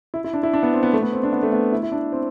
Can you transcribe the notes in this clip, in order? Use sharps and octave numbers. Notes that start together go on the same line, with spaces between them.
E4
E4
D4
E4
D4
B3
C4
B3
A3
B3
C4
D4
B3
A3
B3
E4
E4
D4
C4